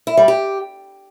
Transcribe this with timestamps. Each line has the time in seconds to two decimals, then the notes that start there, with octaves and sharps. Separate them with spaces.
0.07 E4
0.17 G3
0.28 G4